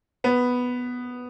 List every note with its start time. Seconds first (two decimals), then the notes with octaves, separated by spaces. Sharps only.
0.24 B3